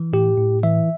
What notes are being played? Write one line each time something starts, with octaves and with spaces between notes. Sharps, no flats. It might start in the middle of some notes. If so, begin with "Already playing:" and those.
Already playing: E3
A2 G4
A2
E3 E5